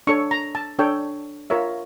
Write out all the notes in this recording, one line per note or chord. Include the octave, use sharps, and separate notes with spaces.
D4 A4 C#5 C#6
A#5
A5
D4 A4 C#5 G5
F4 A#4 C#5 E5